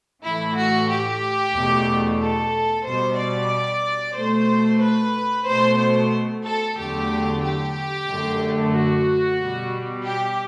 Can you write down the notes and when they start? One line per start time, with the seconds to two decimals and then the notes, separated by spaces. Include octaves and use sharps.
0.23 A2 E3 A3 E4
0.55 F#4
0.89 G4
1.54 E2 B2 A3
2.19 A4
2.85 B2 G3 C5
3.17 D5
4.15 B2 A3 C5
4.80 B4
5.46 B2 A3 C5
5.79 C5
6.44 A4
6.77 E2 D3 F#3 A3 G4
7.43 G4
8.07 F#2 D3 A3
8.73 F#4
9.38 B2 G3
10.04 G4